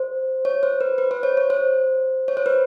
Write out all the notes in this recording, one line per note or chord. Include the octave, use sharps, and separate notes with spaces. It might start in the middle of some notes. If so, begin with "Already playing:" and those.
Already playing: C5
C#5
C5
B4
B4
C5
C#5
C#5
C5
C#5
C5
B4